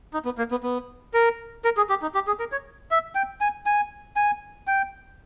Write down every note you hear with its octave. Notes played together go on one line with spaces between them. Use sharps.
D#4
B3
A#3
B3
B3
A#4
A#4
G#4
G4
D#4
G4
G#4
A#4
C#5
E5
G5
G#5
G#5
G#5
G5